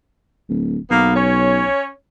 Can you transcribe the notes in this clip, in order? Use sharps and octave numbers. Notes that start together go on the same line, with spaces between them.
D1
B1 A#3 B3
C#4 C#5